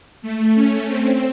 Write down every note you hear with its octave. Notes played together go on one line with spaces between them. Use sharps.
A3
C#4
C4